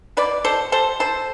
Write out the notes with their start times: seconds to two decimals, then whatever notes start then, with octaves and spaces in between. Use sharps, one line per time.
0.17 B2 B4 D5
0.44 B2 A4 C5
0.72 G3 A4 C5
1.00 G3 A4 C5